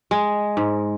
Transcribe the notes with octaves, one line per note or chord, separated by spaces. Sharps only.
G#3
G#2